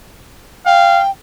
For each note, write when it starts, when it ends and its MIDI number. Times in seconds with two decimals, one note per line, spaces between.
0.66 1.03 77
0.66 1.10 79